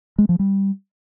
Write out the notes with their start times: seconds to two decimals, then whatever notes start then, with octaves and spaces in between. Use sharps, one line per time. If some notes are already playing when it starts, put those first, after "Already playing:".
0.18 G#3
0.29 F3
0.39 G3